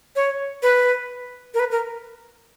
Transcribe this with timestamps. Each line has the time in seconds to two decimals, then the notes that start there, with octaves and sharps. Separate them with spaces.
0.16 C#5
0.63 B4
1.54 A#4
1.59 B4
1.71 A#4